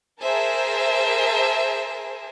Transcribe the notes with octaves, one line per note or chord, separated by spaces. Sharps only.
G#4 A#4 C5 E5 A5